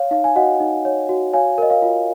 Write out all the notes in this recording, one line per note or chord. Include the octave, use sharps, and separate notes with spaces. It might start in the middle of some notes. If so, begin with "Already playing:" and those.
Already playing: C#5 F5
D#4 F5
G#5
F#4 D#5 F#5
D#4
C#5
F#4
C#5 F5 G#5
A#4 D#5
F5
F4